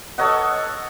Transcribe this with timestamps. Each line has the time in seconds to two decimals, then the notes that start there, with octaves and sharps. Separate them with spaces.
0.18 A4 C#5 D#5 F#5